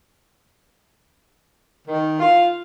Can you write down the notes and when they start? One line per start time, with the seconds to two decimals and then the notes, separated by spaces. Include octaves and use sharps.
1.88 D#3
2.20 F4